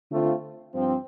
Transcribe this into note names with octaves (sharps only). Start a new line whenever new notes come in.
D3 A3 C4 F4
G2 F3 C4